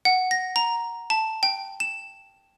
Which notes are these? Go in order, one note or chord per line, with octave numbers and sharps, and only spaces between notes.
F#5
A#6
A#5
A5
G5
E7